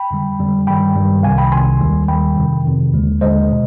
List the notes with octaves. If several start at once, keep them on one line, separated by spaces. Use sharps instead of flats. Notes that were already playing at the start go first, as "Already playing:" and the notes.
Already playing: G5 B5
F2 D3 G3
F2 D3 G3
G2 D#3 G3 G5 B5
G2 D#3 G3
C2 C3 D#3 F5 G#5
G5 B5
C2 C3 D#3 G#5 C6
D#2 D#3 G3
D#2 D#3 G3 G5 B5
F2 C3 D#3
F2 C3 D#3
D#2 D3 G#3
D#2 D3 G#3 C5 D#5
B2